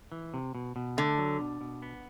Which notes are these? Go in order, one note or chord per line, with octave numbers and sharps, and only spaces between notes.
E3
C3
B2
B2
D3 A3
F#3
B2
B2
B3